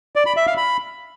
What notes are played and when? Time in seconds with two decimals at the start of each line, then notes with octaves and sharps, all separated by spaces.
0.16 D5
0.26 B5
0.37 E5
0.47 F5
0.58 B5